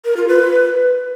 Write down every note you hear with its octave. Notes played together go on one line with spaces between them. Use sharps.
A#4
F4
B4